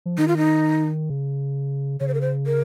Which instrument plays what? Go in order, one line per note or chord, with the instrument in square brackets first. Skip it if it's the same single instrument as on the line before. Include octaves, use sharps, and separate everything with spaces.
[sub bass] F3
[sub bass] D#3 [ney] D#4
[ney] F4
D#4
[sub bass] C#3
[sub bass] C#3 [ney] C#5
[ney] C5
A#4
C5
A#4